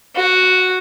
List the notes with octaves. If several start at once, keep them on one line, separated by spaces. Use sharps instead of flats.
F#4